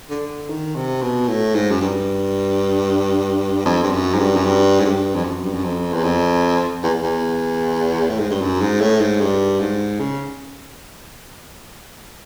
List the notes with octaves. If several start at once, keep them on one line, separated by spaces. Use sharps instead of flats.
D3
D#3
C3
B2
A2
G#2
F#2
G2
F2
G2
F#2
G#2
G2
F#2
G2
G#2
G2
F2
F#2
G2
F#2
F2
E2
F2
E2
E2
A2
G#2
G2
F#2
G#2
A2
G#2
G2
G#2
C#3